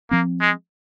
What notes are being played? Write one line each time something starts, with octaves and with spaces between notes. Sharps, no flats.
F3 A#3 C4
G#3